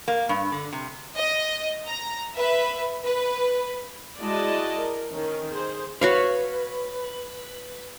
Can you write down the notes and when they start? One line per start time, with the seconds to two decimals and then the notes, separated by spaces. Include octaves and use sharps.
0.08 A#3
0.29 G2
0.52 D3
0.73 C3
1.16 D#5
1.87 A#5
2.35 B4 E5
3.04 B4
4.19 G#3 E4 F#4 D5 D#5 A5
4.78 A#4
5.12 D#3 C#4
5.50 G#4 C5
6.01 F#4 B4 C#5 F5